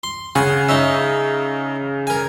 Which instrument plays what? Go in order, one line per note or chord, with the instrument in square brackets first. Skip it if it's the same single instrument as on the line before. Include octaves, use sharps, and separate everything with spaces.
[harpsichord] C6
[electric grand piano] C#3 [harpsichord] F#5 G#5 C#6
[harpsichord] D#4 C#5 E5
A#4 G#5